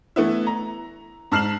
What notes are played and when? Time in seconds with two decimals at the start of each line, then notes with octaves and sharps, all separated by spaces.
0.16 E3 A3 B3 E4
0.47 A#5
1.32 G#2 A5 F6 C7 E7 F#7